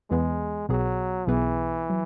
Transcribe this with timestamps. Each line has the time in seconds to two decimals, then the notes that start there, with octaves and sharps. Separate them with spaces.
0.10 E2 E3 G#3 B3 G#4 B4
0.69 B1 B2 F#3 B3 G#4
1.27 B1 B2 E3 B3 G#4 B4
1.90 F#3